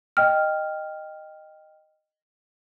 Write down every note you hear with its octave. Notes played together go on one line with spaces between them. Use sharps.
D#5 G5 F6